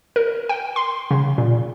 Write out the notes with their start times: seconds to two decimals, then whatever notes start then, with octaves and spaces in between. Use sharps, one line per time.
0.16 A#4
0.49 G5
0.76 C6
1.11 C#3
1.38 A#2